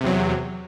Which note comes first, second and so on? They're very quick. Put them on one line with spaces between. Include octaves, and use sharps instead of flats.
C3 E2 F#3